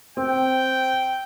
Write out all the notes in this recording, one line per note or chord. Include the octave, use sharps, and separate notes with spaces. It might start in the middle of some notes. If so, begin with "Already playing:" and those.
C4 G5